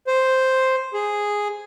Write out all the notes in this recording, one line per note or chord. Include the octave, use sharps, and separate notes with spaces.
C5
G#4